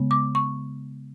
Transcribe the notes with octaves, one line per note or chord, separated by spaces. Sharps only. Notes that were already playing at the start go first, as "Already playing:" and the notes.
Already playing: C#3 G#3 B3
D6
C#6